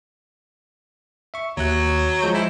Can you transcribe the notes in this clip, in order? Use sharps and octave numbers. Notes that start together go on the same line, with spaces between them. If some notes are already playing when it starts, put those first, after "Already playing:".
E5 C#6
D#2 F#3 F#6
F3 G#3 G6
E4